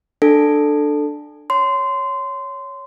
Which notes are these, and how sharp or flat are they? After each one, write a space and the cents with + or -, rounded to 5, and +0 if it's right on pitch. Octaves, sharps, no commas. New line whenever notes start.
D4 +15 A4 +0
C#5 +5 C6 -20